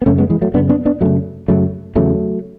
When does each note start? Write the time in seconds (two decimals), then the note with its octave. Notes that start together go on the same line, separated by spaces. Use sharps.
0.02 B3
0.06 F#2 C#3 A3 C#4
0.18 G#3 B3
0.30 E3 G#3
0.42 F#3 A3
0.54 F#2 C#3 B3 D4
0.69 B3 D4
0.85 B3 D4
1.01 F#2 C#3 F#3 A3
1.48 F#2 C#3 F#3 A3
1.95 E2 C#3 F#3 A3